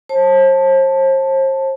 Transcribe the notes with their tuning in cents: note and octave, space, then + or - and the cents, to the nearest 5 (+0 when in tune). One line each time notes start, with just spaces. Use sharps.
C5 +40 A5 +0